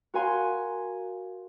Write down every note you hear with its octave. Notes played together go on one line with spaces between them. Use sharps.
F#4 A#4 F5 G#5 C6